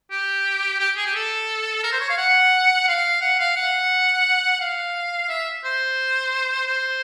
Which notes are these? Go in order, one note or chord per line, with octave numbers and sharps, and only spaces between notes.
G4
G4
G#4
G4
A4
A#4
C5
C#5
F5
F#5
F5
F#5
F5
F#5
F5
E5
C5
C5